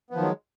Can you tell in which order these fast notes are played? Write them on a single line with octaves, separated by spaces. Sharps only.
B3 F3 D#3 F#3 G#3